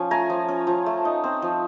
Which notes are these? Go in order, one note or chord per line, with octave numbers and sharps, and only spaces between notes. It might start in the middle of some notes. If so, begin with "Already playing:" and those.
Already playing: F3 C#4
A3 G#5 A#5
F3
C#4
F3
A3
D#4
C4
F3